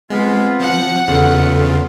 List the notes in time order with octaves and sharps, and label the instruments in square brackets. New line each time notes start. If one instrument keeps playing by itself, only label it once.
[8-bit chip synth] G#3 [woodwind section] B3 F4 [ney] C4
[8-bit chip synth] F3 [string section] F#5
[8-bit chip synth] E2 C#3 [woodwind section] B3 F4 [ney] A4